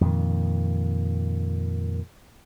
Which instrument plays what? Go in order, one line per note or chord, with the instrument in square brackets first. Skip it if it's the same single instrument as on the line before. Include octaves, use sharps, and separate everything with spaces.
[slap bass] F2 A#2 D#3